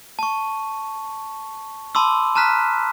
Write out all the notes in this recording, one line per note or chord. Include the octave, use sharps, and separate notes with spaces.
A5 C#6
A5 B5 C6 D6 E6
A5 A#5 F6 F#6 B6